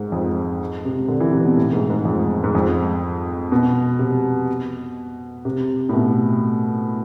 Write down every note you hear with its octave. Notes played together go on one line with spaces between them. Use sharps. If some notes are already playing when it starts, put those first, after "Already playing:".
Already playing: G#2
F2
C3
D3
E3
C3
B2
A2
G#2
G#2
F2
G#2
F2
B2
C3
C3
A2
B2